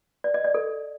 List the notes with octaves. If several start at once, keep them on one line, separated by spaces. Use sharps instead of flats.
D5
D#5
D5
A4